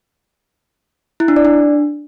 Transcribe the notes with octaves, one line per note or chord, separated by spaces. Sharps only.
E4
D4
D5
D4